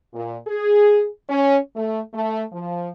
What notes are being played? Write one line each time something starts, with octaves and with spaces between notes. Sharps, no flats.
A#2
G#4
C#4
A3
A3
F3